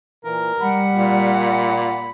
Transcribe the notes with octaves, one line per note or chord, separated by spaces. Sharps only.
A#2 E3 A#4
G3 F#5 B5
A#2